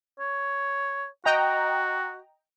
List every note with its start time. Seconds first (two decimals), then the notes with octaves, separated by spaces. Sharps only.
0.19 C#5
1.25 F#4 D#5 G5 A#5